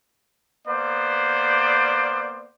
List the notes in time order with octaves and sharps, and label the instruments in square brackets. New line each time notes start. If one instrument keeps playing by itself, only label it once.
[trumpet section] A#3 B3 C5 D5